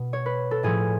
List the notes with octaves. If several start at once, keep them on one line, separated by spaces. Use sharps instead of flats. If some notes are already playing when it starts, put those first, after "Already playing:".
Already playing: B2
C#5
B4
A4
A2 F3 G#4